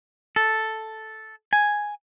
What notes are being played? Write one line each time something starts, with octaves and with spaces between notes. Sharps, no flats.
A4
G#5